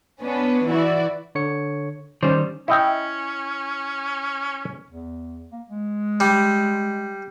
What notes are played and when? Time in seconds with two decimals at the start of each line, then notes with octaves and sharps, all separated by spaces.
0.21 B3 C#4 D4 B4
0.68 E3 E4 F#4 D5
1.35 D3 C#5 C#7
2.23 D#3 G3 C#4 C5 D5
2.68 C#4 E4 D#5 G5
4.91 E2
5.52 A#3
5.70 G#3
6.20 G3